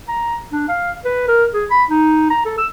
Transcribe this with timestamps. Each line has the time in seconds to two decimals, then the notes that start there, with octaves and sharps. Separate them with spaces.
0.09 A#5
0.53 D4
0.69 F5
1.05 B4
1.28 A#4
1.54 G#4
1.71 B5
1.90 D#4
2.30 A#5
2.45 A4
2.58 E6